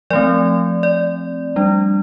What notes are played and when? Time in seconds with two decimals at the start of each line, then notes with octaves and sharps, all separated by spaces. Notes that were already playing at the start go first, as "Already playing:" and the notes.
0.10 F3 A3 C4 D5
0.83 D5
1.56 G3 D4